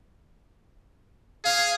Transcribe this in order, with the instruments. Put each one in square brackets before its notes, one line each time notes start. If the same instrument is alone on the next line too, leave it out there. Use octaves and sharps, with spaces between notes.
[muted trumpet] G#4 [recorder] F5